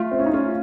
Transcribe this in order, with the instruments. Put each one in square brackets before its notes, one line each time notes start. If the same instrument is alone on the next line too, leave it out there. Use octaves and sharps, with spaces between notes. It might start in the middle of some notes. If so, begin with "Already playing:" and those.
Already playing: [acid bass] A3 [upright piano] F4
[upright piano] C4
C#4
D#4
C#4 F4